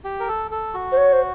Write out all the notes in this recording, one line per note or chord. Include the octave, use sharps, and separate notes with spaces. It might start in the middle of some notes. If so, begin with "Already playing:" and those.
G4
A#4
A4
A4
F#4
C5
C#5
C5